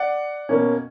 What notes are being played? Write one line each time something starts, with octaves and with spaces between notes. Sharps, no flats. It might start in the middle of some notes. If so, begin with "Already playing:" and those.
Already playing: D5 F#5
B2 A#3 C#4